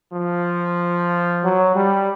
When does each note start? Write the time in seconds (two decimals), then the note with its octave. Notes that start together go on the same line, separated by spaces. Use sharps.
0.13 F3
1.43 F#3
1.75 G3